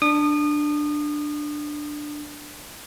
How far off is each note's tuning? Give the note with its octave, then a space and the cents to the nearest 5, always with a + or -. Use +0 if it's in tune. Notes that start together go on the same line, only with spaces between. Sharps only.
D4 +10 D#6 -30